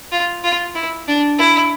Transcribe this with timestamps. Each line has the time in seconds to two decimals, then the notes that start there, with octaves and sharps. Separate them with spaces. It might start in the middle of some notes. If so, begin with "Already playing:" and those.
0.12 F4
0.44 F4
0.75 E4
1.08 D4
1.39 E4